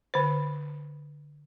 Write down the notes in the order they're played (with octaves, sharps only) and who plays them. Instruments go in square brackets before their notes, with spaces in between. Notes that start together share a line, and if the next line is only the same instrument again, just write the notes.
[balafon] D3 C5